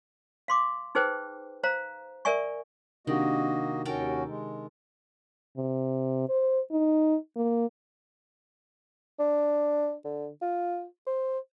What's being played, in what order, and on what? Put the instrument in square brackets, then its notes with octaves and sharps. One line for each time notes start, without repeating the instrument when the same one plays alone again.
[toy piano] F5 C6 D6
D#4 G#4 B4 C5 G5
C5 F5 A#5
A#4 D5 E5 G#5 C#6
[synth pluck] C3 D4 G4 [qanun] D#3 [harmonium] A#3 F#4 D#5
[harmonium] D#2 C#4 F#4 [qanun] A4 A#4 G5
[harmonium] G#3
[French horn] C3
C5
D#4
A#3
[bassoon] D4
D3
F4
C5